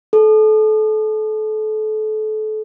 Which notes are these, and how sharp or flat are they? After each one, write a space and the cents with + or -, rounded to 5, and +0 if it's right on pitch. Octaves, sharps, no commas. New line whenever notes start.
A4 -30